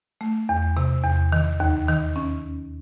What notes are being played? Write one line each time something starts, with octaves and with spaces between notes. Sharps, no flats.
A3
E2
C3
E2
D#3
D#2
D#3
C#4